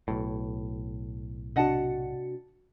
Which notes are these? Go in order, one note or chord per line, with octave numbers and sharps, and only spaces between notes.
B1 A2
C3 D4 F#4 D#5 F#5 A5